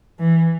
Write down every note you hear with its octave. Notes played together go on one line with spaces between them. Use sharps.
E3